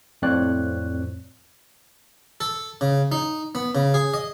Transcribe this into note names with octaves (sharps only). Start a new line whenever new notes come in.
F2 A2 C4 C#5 D5 F#6
A4
C#3
D#4
B3
C#3
G#4
D#5